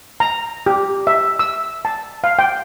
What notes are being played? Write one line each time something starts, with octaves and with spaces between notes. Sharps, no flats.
A#5
G4
E5
E6
A5
F5
G5